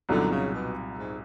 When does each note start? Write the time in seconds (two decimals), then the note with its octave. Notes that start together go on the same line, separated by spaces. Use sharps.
0.09 C2 A#2 D3 F#3 B3 D#4
0.31 C#3
0.52 B2
0.97 G#2